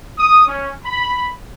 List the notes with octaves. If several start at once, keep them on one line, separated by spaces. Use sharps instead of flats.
D#6
C#4
B5